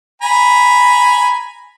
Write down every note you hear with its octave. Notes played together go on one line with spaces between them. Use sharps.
G#5 A#5 B5